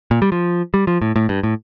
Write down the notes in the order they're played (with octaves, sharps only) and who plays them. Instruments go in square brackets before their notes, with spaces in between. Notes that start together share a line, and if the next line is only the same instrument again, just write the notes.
[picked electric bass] A#2
G3
F3
G3
F3
A2
A2
G2
A2